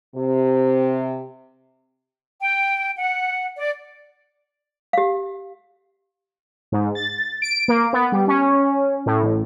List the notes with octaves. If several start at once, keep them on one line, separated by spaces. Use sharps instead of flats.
C3
G5
F#5
D5
G4 F5
G#2
A6
D7
A#3
B3
G3
C#4
A2
A1